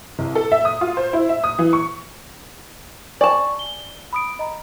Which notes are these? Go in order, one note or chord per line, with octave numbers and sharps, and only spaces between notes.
C2
A4
E5
D#6
F4
C5
E4
E5
D#6
E3
C#6
D5 G#5 A5 C#6
G7
B5 D#6 D7
D#5 A#5